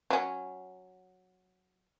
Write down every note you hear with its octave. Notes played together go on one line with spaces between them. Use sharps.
F#3 C#4